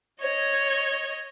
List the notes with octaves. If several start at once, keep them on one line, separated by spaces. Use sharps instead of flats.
C#5 D#5